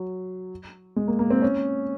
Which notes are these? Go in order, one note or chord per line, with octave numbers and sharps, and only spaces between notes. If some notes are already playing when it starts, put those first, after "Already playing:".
Already playing: F#3
G#3
A#3
A#3
C4
C#4